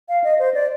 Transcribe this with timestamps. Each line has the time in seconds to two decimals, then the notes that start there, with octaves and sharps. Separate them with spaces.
0.09 F5
0.24 D#5
0.39 C5
0.54 D5